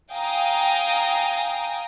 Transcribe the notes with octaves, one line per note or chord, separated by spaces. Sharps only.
F5 G5 G#5 A#5 D#6